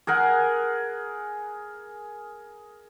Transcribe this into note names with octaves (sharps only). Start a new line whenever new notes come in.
G#4 A#4 F#5 G#5